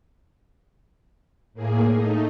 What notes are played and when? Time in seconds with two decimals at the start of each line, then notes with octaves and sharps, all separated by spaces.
1.54 A2 A#3 G#4
1.91 A3 D#4